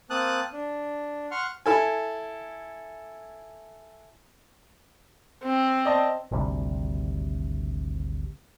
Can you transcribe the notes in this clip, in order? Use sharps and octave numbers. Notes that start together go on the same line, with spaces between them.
A#3 C4 A5 D#6 F#6
D4
F#5 C6 C#6 F6
E4 A4 G#5
C4
D5 D#5 A5
G#1 D2 C3 G3